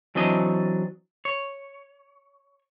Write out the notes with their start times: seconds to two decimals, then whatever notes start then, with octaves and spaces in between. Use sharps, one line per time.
0.15 E3 F#3 C4 D4 D#5
1.25 C#5